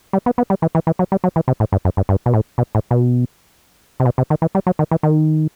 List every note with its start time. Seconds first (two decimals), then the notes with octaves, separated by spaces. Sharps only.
0.13 G3
0.26 B3
0.38 B3
0.50 G3
0.62 E3
0.75 E3
0.87 E3
0.99 F#3
1.12 G3
1.24 F#3
1.36 E3
1.48 C3
1.60 A2
1.72 G2
1.85 F#2
1.97 G2
2.09 G2
2.26 B2
2.34 A2
2.58 B2
2.75 A2
2.91 B2
4.00 C3
4.05 B2
4.18 C3
4.30 D#3
4.42 E3
4.55 G3
4.67 F#3
4.79 D#3
4.91 E3
5.03 D#3